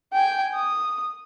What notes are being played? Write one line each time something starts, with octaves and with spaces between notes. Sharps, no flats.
G5 G#5
D#6